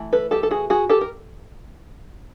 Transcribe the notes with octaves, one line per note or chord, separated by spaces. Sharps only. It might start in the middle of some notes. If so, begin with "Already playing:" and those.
Already playing: E3 A3
A4 B4
G4 A4
A4
F#4 G#4
F#4 G#4
G4 A4
A#4